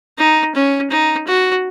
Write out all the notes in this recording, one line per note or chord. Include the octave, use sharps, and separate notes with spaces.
D#4
C#4
D#4
F#4